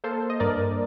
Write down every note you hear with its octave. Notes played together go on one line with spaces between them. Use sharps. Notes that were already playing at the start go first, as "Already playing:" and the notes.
A#3 A4 C5
D#5
G2 A#4 D5